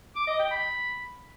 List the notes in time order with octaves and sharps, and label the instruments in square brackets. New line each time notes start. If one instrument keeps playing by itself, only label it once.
[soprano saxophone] D6
D#5
G5
B5